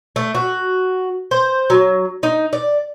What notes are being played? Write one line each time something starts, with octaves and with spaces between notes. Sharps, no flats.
A3
F#4
C5
F#3
D#4
D5